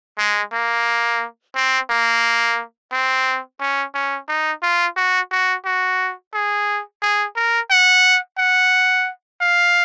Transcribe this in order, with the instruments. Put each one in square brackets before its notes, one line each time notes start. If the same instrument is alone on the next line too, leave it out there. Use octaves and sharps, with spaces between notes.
[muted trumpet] G#3
A#3
C4
A#3
C4
C#4
C#4
D#4
F4
F#4
F#4
F#4
G#4
G#4
A#4
F#5
F#5
F5